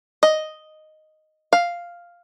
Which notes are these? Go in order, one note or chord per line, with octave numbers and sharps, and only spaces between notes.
D#5
F5